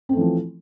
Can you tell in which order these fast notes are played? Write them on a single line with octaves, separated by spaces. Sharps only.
C4 A3 E3 F3